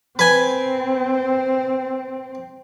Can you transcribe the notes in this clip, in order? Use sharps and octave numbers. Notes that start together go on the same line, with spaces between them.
C4 B4 G#5